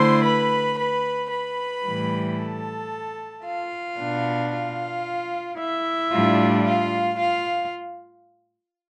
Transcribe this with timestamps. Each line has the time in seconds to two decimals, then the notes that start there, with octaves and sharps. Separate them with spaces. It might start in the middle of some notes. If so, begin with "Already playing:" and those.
Already playing: D3 A3 E4 C5 C6
0.24 B4 B5
0.77 B4 B5
1.30 B4 B5
1.84 A2 E3 G3
2.37 A4 A5
3.45 F4 F5
3.99 B2 B3 D4
4.51 F4 F5
5.59 E4 E5
6.12 A2 G3 D4 F4
6.66 F4 F5
7.20 F4 F5